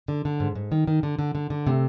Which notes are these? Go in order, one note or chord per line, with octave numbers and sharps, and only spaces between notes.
D3
D3
G#2
G#2
D#3
D#3
D3
D3
D3
D3
C3 A3